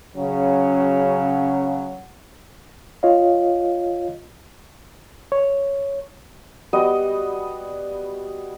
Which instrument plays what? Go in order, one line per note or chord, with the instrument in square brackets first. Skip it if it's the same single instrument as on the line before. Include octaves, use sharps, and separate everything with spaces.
[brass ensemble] C#3 F#3
[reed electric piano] F4 C#5 D#5 F5
C#5
[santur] G3 B3 F#4 D#5